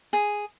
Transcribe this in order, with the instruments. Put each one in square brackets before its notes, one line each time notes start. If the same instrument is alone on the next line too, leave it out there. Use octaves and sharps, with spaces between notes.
[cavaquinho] G#4